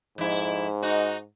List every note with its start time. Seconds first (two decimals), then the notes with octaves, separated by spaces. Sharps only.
0.18 F2 G#2 E4
0.83 D#4 F#4